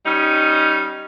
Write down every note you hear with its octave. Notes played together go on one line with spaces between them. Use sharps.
G3 C#4 D#4